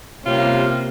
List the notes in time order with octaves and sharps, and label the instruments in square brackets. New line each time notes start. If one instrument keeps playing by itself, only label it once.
[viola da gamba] C3 A#3 [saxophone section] G3 C#4 F4